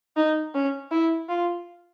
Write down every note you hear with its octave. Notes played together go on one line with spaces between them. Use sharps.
D#4
C#4
E4
F4